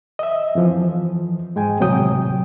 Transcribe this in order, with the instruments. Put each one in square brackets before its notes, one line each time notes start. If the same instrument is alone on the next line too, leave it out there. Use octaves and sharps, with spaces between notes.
[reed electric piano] D#5 E5
F2 E3 F3
G#2 G#3 G5 G#5
D#2 A2 C3 F#3 G5 D#6